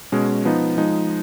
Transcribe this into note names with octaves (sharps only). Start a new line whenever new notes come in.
B2 G#3 C#4
F3 B3 D#4
F3 G#3 D#4